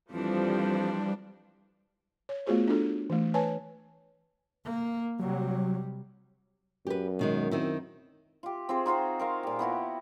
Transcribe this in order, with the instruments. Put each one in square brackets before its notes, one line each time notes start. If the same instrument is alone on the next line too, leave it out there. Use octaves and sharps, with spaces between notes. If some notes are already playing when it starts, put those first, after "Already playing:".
[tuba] F2 [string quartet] E3 D4 [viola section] F3 [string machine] G3
[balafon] C#5
A3 B3 F4 F#4 G#4 C5
D4 E4 F#4 A4
E3 A3
B4 C#5 G#5 A5
[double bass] A#3
[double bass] C3 G3 [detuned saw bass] F#3
[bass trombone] F#2 [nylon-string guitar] G4 B4
[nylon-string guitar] B2 D#3 G#3
D#3 C4 E4
[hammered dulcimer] F4 G4
C4 F4 G#4 C5
D#4 F4 F#4 C5
A#4 C5 F5
A#2 G4
B3 E4 F#4 G4